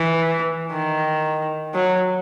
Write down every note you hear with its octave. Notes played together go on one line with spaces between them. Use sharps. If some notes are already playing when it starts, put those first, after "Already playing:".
Already playing: E3
D#3
F#3